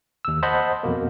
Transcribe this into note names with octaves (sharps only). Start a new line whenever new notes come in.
D#2 E6
C5 D#5 F#5 A5 B5
F2 B2 A#3